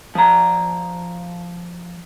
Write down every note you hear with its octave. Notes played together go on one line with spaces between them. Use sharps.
F3 A#5